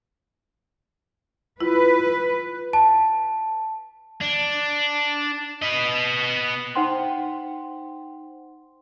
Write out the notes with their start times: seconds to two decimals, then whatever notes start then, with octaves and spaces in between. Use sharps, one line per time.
1.61 E4 F4 B4
2.73 A5
4.21 D4
5.62 B4 D#5
6.75 D#4 C5 F#5 G5 C6